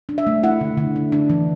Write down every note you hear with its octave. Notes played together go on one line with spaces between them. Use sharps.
D4
E5
A3
E4 F#5
D3
D3
D4
D4
E3